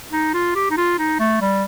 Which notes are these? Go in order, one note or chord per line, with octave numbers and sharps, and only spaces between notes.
D#4
F4
G4
D#4
F4
D#4
A3
G3